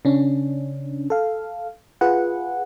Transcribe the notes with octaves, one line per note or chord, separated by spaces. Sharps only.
C#3 C#4 D4
A4 F5
F4 G#4 B4 F#5